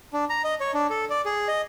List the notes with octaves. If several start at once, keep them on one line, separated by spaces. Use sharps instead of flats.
D4
A#5
D#5
C#5
D4
A4
D5
G#4
D#5